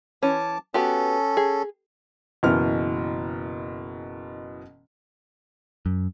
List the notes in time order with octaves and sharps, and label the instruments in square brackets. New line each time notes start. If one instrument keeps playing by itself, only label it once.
[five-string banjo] E3 C#4 [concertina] A5 D6
[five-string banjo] B3 F#4 G4 [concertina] C#4 A4
[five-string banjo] G#4
[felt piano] F#1 B2 E3 F6
[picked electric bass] F#2